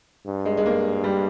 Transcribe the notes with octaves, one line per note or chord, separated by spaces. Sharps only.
G2
G#3
G#3
A#3
G3